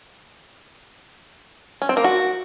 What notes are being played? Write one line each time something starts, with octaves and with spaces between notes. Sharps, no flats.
C#4
C4
A#3
F#4